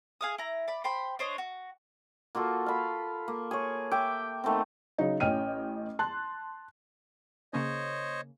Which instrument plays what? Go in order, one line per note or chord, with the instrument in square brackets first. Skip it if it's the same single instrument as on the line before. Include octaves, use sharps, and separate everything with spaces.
[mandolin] G#4 F5 D#6
E4 A#5
D5 B5
C5 G5 B5 C6
D4 C5 C#5 D#5
F#4
[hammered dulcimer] A#3 F4 F#4 A4
F5 B5
A#3
G#4 C#5
E5 G5 D6
D#3 A3 B3 C4
[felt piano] C#3 F#3 D#4
A1 C#4 D#5 G5 F6 D#7
A5 C6 F#6
[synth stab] C#3 A#3 C#4 [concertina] C5 C#5 D#5